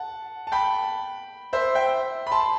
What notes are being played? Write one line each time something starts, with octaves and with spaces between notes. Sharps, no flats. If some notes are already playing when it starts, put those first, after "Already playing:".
Already playing: F#5 A5
A5
G5 B5
C5 E5
E5 G5
B5
A5 C6